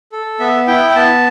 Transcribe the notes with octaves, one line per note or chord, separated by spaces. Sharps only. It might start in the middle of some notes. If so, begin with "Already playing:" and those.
A4
B3 E5
E4 G5
G5
B3 A5